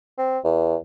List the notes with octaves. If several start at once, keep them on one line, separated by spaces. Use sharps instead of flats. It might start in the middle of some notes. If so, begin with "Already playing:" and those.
C4
E2